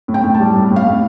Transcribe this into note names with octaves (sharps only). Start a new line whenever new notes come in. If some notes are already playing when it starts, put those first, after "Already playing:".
A2
G5
A2
A5
G3
A2
A2
F5
A2